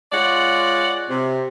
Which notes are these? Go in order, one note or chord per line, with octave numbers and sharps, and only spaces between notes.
G#3 F4 C#5 D5 F#5
C3